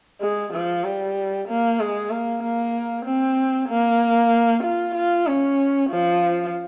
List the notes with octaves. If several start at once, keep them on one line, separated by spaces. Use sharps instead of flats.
G#3
F3
G3
A#3
G#3
A#3
A#3
C4
A#3
F4
F4
C#4
F3